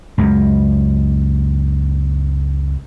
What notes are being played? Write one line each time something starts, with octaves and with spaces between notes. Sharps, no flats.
C#2 F#2